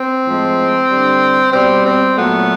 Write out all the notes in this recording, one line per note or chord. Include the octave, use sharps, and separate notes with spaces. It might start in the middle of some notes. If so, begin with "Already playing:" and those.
Already playing: C4
A2 F3 G#3
D3 G3
B2 G3 C4
C4
A#2 F#3 A3 B3